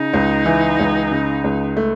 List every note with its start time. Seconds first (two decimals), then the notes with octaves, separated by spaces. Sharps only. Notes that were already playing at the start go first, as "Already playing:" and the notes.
Already playing: C#3 D#4
0.13 C#2
0.46 E3
0.79 C#2
1.11 C#3
1.44 C#2
1.77 A3